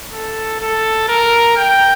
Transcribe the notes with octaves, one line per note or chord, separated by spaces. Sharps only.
A4
A4
A#4
G5